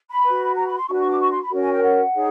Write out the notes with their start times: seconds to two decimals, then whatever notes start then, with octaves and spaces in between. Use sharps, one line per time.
0.09 B5
0.24 F#4 B4
0.56 A#5
0.66 B5
0.77 C6
0.87 D4 F#4 B4 C#6
0.99 C#6
1.08 D6
1.20 C#6
1.31 C6
1.41 B5
1.51 C#4 F#4 A#4 C#5
1.62 G#5
1.72 G5
1.83 F#5
2.14 D#4 G#4 C#5